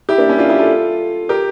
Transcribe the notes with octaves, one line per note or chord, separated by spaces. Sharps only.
E4 G4
A#3 D4
C#4 E4
D4 F4
E4 G4
F4 A4
G4 A#4